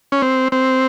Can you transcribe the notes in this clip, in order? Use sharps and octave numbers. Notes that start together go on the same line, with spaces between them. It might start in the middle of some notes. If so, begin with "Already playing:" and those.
C#4
C4
C4